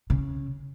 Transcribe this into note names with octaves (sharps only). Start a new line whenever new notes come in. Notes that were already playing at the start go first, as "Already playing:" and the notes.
C#3